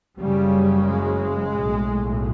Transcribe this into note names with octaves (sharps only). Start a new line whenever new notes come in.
F#1 F#2 C#3 G3
G#3
B1 A2